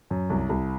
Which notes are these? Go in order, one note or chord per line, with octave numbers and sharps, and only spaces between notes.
F#2
C2
C2